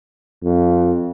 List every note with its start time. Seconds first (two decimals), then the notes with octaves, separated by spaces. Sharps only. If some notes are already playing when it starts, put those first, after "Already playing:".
0.44 F2